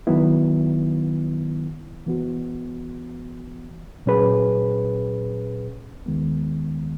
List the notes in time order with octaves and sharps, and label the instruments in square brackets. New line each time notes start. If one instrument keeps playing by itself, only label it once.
[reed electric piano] D#3 F#3 B3 E4
E3 B3 F#4
A#2 F#3 C#4 G#4 B4
D#2 D#3 G#3 B3